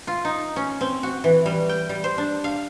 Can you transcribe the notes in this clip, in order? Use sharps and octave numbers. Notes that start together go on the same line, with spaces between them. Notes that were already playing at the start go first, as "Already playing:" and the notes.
F4
D#4
C#4
C4
F#4
E3
G3
G5
G3
C5
D4
F5